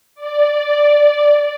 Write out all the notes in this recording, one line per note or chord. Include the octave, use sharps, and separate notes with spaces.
D5